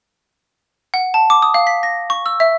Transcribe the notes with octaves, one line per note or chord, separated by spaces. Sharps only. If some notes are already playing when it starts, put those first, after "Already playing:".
F#5
A5
D6
D#6
F5
B6
A#6
C#6
E6
E5